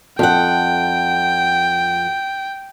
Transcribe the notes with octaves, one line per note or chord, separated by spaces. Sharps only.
F2 F#5 G5